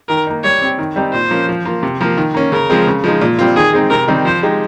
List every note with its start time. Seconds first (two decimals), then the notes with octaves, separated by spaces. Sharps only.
0.09 D#3 A#4
0.27 A#3 D#4
0.43 G3 C#5
0.62 C4 G4
0.79 D#3
0.96 G3 C4 D#4 G4
1.13 A#2 C5
1.31 F3 A#3 C#4
1.49 F3
1.66 A#3 F4
1.83 C3
2.01 F3 A#3 F4
2.17 D#3
2.34 A#3 C#4
2.52 C#3 A#4
2.70 F3 G#3 C4
2.87 C#3
3.04 F3 G#3 D#4
3.21 A#2
3.39 G3 C4 F4
3.56 D#3 G#4
3.73 G#3 C4 D#4
3.90 C3 A#4
4.08 D#3 G3 C4 D#4
4.25 F3 C5
4.43 G#3 D#4 G4